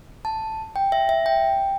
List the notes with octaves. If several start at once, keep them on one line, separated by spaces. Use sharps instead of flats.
A5
G5
E5
E5
G5